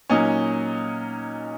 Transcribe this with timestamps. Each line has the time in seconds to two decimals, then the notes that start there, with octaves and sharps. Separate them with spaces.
0.10 A#2 F#3 C#4 D#4